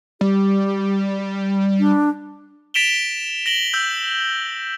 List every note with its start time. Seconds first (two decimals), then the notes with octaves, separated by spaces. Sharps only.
0.21 G3 G4
1.80 D4
2.74 A6 B6 D7 E7 F7 G7
3.46 A#6 D7 F#7 G7
3.74 E6 G6